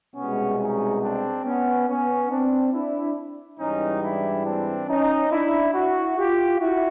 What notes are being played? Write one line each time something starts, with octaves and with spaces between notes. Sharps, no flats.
C2 B2 G#3 B3 C#4
C#4 D#4
C4 D4
B3 C#4
B3 C#4
C4 D4
D4 E4
G#2 E3 G3 C#4 D#4
D4 E4
C4 D4
C#4 D#4
D4 E4
E4 F#4
F4 G4
E4 F#4